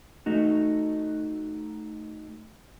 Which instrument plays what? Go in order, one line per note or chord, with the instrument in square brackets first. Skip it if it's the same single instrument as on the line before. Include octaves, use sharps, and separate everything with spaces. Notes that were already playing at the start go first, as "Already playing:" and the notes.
[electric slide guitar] A3 D#4 F#4